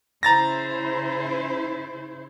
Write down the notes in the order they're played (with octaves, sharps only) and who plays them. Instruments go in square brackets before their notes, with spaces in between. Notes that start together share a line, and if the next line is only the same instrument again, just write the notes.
[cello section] C#3 E4 C5 [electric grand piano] A#5 A6 A#6